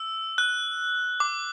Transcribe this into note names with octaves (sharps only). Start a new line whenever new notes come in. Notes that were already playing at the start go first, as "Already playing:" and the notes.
Already playing: E6
F#6
D6